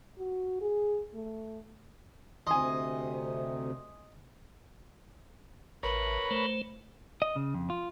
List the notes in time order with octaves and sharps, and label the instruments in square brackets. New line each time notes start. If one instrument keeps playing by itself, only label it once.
[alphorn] F#4
G#4
A3
[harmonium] D2 C3 [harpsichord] D#5 [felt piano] G#5 C6
[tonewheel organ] A1 [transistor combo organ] A#4 B4 C#5 [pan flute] B5
[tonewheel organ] A3 C5
[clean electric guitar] D#5
C#3
F2
F4